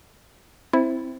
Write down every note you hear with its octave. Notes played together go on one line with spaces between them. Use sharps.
C4 E4